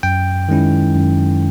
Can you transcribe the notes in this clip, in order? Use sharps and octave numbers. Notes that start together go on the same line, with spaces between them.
F#2 G5
D#3 G#3 C#4 E4
F#2